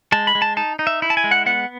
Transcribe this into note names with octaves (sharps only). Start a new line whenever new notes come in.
G#3 A5
B5
G#3
A5
D#4 A5
D#4
E5
E4
A5
G#5
G#3
F#5
B3 F#5